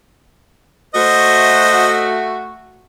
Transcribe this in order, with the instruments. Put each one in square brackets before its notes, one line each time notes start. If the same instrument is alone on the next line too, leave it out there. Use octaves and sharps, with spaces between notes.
[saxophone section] A3 F#4 [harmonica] C5 D#5